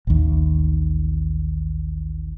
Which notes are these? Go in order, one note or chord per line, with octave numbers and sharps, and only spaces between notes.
A1 D#2